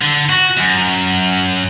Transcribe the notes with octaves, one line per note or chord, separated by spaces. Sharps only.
D3
F#4
F#2